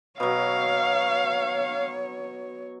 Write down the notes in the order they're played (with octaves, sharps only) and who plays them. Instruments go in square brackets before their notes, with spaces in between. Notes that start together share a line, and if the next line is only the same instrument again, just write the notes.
[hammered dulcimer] B2 F#3 [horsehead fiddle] C#5 [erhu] F5